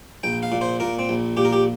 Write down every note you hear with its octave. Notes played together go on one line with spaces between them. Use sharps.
A#1 G5
F5
A#2
C5
A#2 A#4
C4
A#1
A#2 G4
A#4
G4